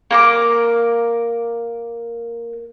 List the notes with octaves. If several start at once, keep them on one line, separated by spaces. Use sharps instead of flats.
A#3 A#4 D6